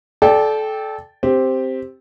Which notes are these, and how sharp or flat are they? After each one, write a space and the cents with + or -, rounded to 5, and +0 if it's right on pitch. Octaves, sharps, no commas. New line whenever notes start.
A4 -25 D5 +0 G5 +0
C4 +0 G4 +0